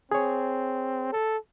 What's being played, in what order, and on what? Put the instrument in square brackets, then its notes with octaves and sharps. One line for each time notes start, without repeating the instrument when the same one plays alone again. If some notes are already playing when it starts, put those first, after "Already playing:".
[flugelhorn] C4 [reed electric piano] G#4 C#5
[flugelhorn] A4